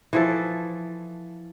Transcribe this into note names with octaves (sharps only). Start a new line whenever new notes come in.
E3 F3 A4